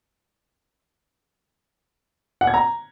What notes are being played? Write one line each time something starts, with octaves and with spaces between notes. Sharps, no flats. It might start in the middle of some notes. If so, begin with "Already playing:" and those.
F#5
G#6
A#5